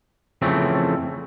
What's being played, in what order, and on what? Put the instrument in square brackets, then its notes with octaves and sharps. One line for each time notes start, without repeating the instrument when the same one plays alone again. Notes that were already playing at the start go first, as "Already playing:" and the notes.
[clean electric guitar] F2 C#3 E3 A3 C4